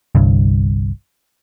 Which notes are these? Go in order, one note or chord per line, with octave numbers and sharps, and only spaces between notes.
G1 C2 G2